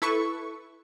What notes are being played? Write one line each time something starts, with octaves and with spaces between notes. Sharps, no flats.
E4 A4 B4 C#6